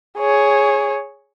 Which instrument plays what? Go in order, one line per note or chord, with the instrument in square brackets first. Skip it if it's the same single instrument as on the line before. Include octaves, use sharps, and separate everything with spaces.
[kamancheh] G#4 C#5